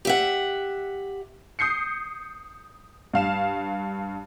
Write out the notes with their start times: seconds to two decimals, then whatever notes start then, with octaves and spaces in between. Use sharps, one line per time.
0.05 G4 E5 F#5
1.59 D#6 G6 C7 C#7
3.14 G2 F5 E7